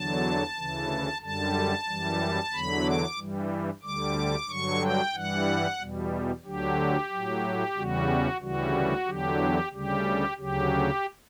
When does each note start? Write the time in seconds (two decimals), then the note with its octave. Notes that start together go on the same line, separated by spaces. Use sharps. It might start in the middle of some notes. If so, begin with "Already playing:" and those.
Already playing: E2 D3 F#3 A5
0.56 D2 C#3 E3
1.22 F#2 D3 G3 A5
1.87 F#2 E3 G3
2.52 E2 D3 F#3 B5
2.85 D6
3.18 G2 E3 G3
3.83 D2 D3 G3 D6
4.48 G2 D3 F#3 C#6
4.81 G5
5.14 G2 E3 G3 F#5
5.79 E2 B2 G3
6.45 D2 D3 F#3 G4
7.11 A2 F#3
7.76 E2 C#3 G3 F#4
8.41 D2 C#3 E3 G3 F#4
9.06 E2 D3 F#3 G4
9.72 D2 C#3 G3 G4
10.37 D2 C#3 F#3 G4